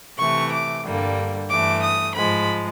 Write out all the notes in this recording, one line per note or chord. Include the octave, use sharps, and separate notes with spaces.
C3 E3 A3 C#6
D6
G2 D3 G3 A#3
G2 E3 A3 D6
D#6
G#2 F3 G#3 B5